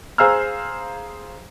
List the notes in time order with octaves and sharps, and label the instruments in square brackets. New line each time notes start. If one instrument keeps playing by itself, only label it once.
[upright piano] G#4 C5 F5 A#5 E6 F6